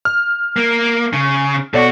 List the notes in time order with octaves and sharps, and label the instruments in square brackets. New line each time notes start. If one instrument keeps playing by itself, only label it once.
[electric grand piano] F6
[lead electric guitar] A#3
C#3
[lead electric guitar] B2 F#4 [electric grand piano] A4 C#5 D5